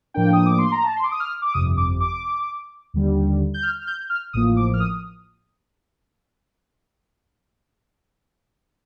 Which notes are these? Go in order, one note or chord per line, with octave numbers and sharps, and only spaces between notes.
A2 F3 A#3 D4 G5
D#6
D6
C6
A#5
A5
C6
D6
D#6
F6
D6
G1 F2 C3 D#6
D6
D6
D#2 D3 G3
G6
F6
F6
G6
F6
A1 A2 F3 A#3 D#6
D6
F6
D#6